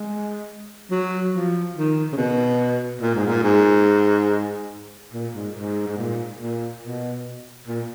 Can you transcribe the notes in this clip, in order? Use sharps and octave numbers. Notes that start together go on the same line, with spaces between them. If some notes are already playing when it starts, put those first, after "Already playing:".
Already playing: G#3
F#3
F3
D#3
C#3
B2
A#2
G#2
A#2
G#2
A#2
G#2
G#2
G#2
A#2
A#2
B2
A#2